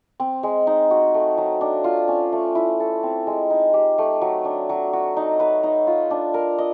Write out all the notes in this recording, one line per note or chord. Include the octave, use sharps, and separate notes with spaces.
C4
G#3
D#4
F#4
A3
F#3
D4
F4
C#4
A3
E4
A4
C4
G#3
D#4
G4
A3
F#3
D4
F#3
F#4
D#4
B4
D#4
F4
D4
A#4
D#5